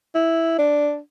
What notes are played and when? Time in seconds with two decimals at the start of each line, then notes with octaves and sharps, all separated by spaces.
0.15 E4
0.59 D4